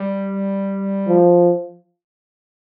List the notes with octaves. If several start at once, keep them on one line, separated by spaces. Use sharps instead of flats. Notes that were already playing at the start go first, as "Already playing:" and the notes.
Already playing: G3
F3